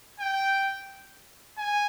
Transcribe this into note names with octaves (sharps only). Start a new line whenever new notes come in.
G5
G#5